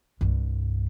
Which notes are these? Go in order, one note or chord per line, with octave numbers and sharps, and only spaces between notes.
C2 G2